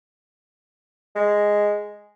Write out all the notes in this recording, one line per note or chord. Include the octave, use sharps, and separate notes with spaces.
G#3